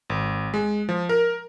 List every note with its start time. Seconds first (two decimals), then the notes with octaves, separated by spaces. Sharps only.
0.10 G#1
0.54 G#3
0.89 F3
1.09 A#4